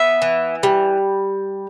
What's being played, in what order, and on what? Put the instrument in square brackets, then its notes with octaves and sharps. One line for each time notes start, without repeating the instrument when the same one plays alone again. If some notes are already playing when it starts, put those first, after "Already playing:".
Already playing: [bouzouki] B3 [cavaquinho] E5
[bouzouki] E3
G3